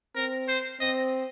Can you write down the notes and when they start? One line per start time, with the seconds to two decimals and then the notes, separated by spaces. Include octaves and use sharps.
0.16 C4 A#4
0.49 C5
0.80 C4 D#5